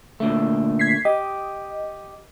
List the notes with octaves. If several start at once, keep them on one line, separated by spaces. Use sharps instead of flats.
A#2 D3 A3
G#6 B6 C7
G4 D#5